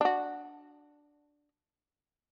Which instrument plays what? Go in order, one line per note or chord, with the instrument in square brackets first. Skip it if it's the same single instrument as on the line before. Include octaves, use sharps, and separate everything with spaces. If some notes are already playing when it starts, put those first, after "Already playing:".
[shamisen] D4 F#4